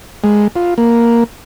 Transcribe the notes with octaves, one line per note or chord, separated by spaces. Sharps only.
G#3
F4
A#3